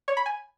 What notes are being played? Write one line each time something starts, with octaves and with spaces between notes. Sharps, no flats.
C#5
B5
G#5